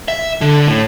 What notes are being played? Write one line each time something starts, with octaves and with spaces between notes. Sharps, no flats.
E5
D3
A2